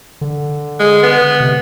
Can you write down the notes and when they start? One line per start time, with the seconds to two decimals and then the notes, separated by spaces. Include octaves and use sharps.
0.21 D3
0.80 G#3
1.03 B3
1.40 C3